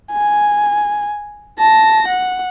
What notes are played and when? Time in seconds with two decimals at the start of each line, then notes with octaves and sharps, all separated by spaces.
0.12 G#5
1.59 A5 A#6
2.08 F#5